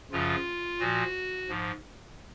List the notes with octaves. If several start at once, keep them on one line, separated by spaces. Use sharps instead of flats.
F#2 C#3 F3 F4
A#2 F3 F#4
G#2 F3